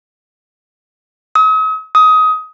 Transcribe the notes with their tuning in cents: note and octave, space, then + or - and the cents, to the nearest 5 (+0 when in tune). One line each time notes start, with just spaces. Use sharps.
D#6 +45
D#6 +20